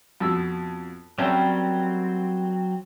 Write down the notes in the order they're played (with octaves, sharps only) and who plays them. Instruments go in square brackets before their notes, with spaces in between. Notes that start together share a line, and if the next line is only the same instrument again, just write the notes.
[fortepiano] F2 B2 E6
[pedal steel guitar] F#3 C4 [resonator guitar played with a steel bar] G3 A#4 G5 [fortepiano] C#4 E5 A5